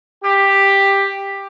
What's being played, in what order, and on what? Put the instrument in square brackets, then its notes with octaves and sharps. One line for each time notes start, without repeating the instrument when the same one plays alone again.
[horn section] G4